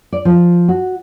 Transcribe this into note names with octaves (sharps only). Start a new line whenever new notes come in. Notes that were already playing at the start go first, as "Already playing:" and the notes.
D5
F3
F#4